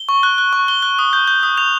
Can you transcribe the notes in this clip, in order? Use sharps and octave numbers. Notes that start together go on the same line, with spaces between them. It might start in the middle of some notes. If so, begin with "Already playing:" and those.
Already playing: G7
C#6
F#6
F#6
C#6
F#6 G7
F#6
D#6
G6
G6
D#6
G6 F7